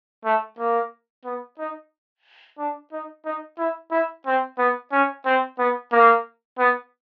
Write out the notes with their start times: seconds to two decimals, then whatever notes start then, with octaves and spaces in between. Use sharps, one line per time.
0.25 A3
0.59 A#3
1.25 B3
1.59 D#4
2.58 D4
2.92 D#4
3.25 D#4
3.58 E4
3.91 E4
4.26 C4
4.58 B3
4.92 C#4
5.26 C4
5.59 B3
5.92 A#3
6.59 B3